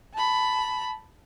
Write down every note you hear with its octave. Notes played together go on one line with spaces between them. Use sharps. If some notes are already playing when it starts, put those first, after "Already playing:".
A5 B5